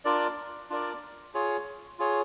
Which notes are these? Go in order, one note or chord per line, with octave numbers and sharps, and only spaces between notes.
D4 F4 A#4 D5
D4 F4 A#4 D5
F4 G#4 C#5
F4 G#4 C#5